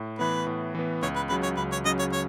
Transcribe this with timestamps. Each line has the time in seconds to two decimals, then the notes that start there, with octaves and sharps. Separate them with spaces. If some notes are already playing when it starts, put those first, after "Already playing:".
Already playing: A2
0.19 E3 B3 B4
0.47 A2
0.75 E3 B3
1.02 C#2 C#5
1.16 B4
1.29 C#3 F#3 B4
1.43 C#5
1.57 C#2 B4
1.72 C#5
1.85 C#3 F#3 D#5
1.99 C#5
2.13 C#5